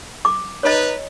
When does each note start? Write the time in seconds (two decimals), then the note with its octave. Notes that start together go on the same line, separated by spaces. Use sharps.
0.25 D6
0.63 D#4 B4 C#5 D#5